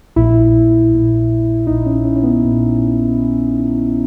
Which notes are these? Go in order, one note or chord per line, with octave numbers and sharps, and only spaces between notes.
A#1 A#2 E4
A#1 A#2
A#1 A#2 D#4
C#4
C#4
C#4
B3
A#2